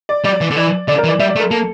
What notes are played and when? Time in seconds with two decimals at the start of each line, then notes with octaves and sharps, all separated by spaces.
0.09 D5
0.24 G3 D5
0.41 E3
0.51 D3
0.56 E3 D5
0.88 D3 D5
0.98 A#4
1.04 E3
1.08 D5
1.19 G3 E5
1.29 D5
1.36 A3
1.40 A#4
1.50 A#3 A4